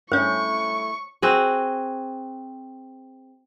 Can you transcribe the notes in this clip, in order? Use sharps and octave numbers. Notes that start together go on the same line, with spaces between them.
G2 A3 C#4 E4 C5 C#5 C#6
C4 F#4 G#4